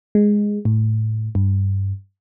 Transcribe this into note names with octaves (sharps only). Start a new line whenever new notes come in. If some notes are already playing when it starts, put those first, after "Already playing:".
G#3
A2
G2